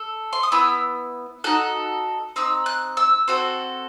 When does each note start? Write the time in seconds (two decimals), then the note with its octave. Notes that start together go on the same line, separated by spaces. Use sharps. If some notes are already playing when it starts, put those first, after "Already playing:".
Already playing: A4
0.33 C6
0.43 D#6
0.52 B3 E4 E6
1.44 D#4 F#4 A4 F#6
2.36 C4 D#4 E6
2.66 F#6
2.97 E6
3.28 C4 F#4 A4